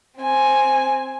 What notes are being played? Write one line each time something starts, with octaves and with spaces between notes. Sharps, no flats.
C4 G#5